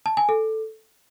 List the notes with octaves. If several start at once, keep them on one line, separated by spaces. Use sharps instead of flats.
A5
G#5
A4